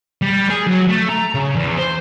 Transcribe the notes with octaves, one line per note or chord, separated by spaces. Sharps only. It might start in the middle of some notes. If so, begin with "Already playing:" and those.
G3
G#4
F#3
A3
A#5
C#3
E2
C5